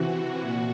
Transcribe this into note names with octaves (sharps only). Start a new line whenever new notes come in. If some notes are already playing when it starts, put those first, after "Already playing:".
Already playing: C3 E3 F#4
A#2